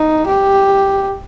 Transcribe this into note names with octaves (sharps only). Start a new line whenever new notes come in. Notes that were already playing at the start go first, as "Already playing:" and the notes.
Already playing: D#4
G4